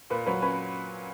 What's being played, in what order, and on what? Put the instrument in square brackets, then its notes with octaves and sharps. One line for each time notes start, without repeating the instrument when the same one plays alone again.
[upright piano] A#2 B4
F#3 B4
C#4 B4